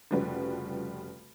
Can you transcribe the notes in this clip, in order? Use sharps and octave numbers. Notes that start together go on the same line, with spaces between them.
F1 C#3 F3 G3 F#4 B4